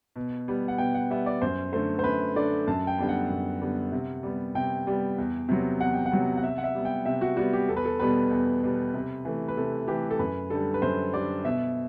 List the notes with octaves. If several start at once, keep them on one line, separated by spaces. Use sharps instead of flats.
B2
G3 B3
F#5
B2 G5
F#5
G3 B3 E5
D5
F#2 C5
D3 A3 C5
C5
F#2 B4
D3 A3 D5
F#2 A5
G5
D3 G3 B3 G5
F#5
F#2
D3 G3 B3
C3
G3 B3
C3 G5
G3 B3
E2
C3 F#3 B3
E2 F#5
G5
F#5
C3 F#3 B3
F#5
C3 E5
F#5
E5
G3 B3
G5
C3 E5
F#4
G3 B3 F#4
G4
E2 A4
B4
A4
B2 G3 B3 B4
E2
B2 G3 B3
C3
E3 A3
B4
C3 A4
E3 A3 G4
A4
F#2 B4
D3 G3 A4
B4
F#2 C5
D3 G3 D5
B2 E5